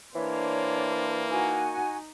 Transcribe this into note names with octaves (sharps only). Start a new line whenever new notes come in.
E3 A#3 D4 C5 C#5
D#4 F#4 G#5